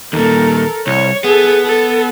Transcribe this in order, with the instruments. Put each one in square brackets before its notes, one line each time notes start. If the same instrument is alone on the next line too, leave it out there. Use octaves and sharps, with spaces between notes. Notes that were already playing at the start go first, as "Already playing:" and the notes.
[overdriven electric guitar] D#2 A#2 [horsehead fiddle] A4 A#4
[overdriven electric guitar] C2 [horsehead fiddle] C#5
[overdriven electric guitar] B3 [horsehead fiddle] G#4 A4
[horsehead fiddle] A4